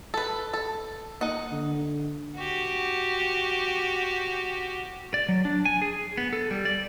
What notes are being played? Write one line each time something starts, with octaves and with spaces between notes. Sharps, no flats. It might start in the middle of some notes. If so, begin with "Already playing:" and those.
A4 B4
A4
A#3 D#4 D#5 F#5
D3
F#4 G4
D5
F#3
D4
G#5
G#4
B3
A4
G3
D5